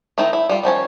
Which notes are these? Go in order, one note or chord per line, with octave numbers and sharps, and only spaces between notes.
D#3 A3 C4 D#4 E4
E4
G3 F4
D#3 F3 C#4 C#5